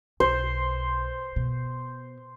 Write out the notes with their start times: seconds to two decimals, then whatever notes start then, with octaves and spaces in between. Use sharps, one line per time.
0.20 B1 C5
1.36 B2